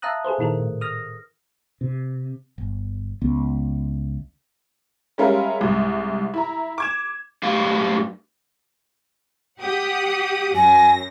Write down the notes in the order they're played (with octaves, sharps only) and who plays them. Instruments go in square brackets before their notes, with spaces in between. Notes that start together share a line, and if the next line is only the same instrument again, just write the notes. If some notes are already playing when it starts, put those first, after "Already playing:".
[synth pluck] E5 F5 A5 A#5 D#6 F#6
G#4 A4 B4 C5
A#2 D#3 E4 A4 A#4
A2
D#6 F6 A#6
[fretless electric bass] C3
G1
C#2 B3
[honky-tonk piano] G3 G#3 C#4 A#4 E5 F5
C2 G#2
E4 A#5
D6 G#6 E7
[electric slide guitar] F#2 A2 G4 F5
[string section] G4 F#5 D#6
[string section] F#2 A#6 [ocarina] G#5